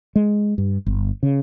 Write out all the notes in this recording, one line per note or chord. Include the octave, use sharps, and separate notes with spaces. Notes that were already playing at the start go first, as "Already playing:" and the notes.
G#3
G2
G1
C#3